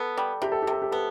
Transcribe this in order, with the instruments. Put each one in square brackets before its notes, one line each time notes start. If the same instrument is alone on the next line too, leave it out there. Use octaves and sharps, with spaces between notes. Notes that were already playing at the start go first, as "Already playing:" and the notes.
Already playing: [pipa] B3 [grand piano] A4
[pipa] G3
[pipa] C3 [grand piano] G4
[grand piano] A4
G4
[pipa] C3 [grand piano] A4
[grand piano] G4
[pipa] B3 [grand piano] A4